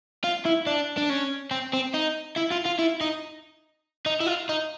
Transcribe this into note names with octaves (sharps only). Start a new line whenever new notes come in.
F4
E4
D4
D4
C#4
C4
C4
D#4
E4
F4
F4
E4
D#4
D#4
E4
F4
D#4